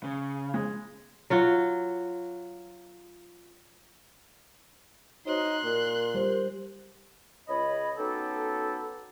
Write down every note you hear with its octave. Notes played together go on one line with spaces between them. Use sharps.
C#3
G#3
F#3 F4 F#4
D#4 F#4 C5 C#5 C6 F#6
A#2 A#4
G3 C5
C#2 C#5 D#5 B5
B3 C#4 D#4 F#4 G4 A4